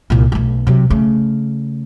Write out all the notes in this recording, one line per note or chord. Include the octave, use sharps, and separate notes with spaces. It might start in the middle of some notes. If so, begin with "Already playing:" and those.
C2 A#2
B1 A3
C3 F#3
C#3 A3